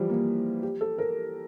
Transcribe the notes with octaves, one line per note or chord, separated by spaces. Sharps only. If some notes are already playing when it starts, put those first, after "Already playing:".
Already playing: E3 F3 G3
A#3
G4
A4
A#4